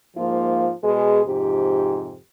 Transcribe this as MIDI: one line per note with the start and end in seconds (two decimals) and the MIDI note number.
0.17 0.70 44
0.17 0.70 53
0.17 0.70 58
0.17 0.70 65
0.84 1.21 47
0.84 1.21 56
0.84 1.21 68
1.27 2.18 41
1.27 2.18 44
1.27 2.18 48
1.27 2.18 67